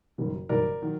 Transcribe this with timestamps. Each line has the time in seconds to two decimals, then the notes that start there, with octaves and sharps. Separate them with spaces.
0.18 F#1 F#2 D#3 G3
0.49 F#1 F#2 D#3 G3 A#4 D5
0.82 D#3 F#3